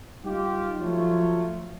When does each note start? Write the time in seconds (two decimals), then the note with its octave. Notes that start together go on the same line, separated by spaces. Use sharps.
0.24 G3 D#4 F4 G4
0.78 F3 F#3 A3 F4 C#5